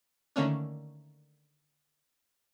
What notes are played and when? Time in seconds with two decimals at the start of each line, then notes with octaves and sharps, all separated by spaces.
0.36 D3 D#3 A3 A#3 C#4 D4